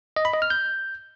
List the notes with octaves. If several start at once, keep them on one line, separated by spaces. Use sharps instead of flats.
D#5
B5
D#5
F6
G6